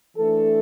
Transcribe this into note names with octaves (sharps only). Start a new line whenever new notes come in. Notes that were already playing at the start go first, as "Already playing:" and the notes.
E3 A3 D4 A4